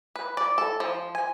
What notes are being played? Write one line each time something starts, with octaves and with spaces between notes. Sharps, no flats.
B4
D5
A4
F3
G#5